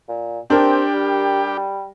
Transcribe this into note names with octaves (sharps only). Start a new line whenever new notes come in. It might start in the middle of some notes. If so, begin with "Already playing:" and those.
A#2
C4 D4 G4 A#4
G3